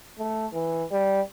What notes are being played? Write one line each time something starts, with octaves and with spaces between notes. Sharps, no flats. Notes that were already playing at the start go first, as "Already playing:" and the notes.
A3
E3
G3